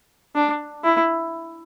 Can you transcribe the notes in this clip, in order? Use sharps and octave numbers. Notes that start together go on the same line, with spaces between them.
D4
E4